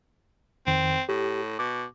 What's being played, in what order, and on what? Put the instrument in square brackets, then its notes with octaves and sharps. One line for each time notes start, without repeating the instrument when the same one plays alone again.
[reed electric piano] F2 D#3 [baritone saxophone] C4
[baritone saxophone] A2 [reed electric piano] G4
[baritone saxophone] B2 [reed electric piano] D6